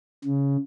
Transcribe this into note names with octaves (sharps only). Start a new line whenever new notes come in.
C#3